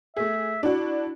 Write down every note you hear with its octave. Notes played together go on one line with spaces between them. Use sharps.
A3 G#4 E5
D4 E4 F#4